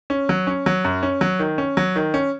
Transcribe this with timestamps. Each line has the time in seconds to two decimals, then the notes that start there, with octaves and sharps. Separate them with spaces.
0.10 C#4
0.29 F#3
0.47 C#4
0.66 F#3
0.85 F#2
1.03 C#4
1.21 F#3
1.39 D#3
1.58 C#4
1.77 F#3
1.96 D#3
2.14 C#4